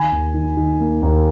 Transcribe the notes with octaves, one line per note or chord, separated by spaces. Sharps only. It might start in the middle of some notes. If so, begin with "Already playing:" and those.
Already playing: D#3 G#5 B5
D#2
D#3
D#3
A#3
D#2